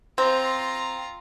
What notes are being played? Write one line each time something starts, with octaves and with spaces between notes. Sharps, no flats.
C4 F4 A#5